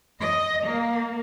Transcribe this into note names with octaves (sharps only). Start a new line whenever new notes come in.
D#5
A#3